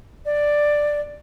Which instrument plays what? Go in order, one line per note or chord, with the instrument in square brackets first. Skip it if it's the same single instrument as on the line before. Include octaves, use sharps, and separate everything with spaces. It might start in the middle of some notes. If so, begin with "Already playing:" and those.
[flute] D5